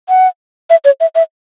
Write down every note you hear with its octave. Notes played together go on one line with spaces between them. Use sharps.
F#5
E5
C#5
E5
E5